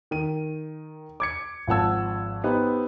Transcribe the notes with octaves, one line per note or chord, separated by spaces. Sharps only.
D#3 D#7
D6 G#6 C#7
G#1 F3 F#5 A5 E6 G#6
B3 D#4 G4 B4 C5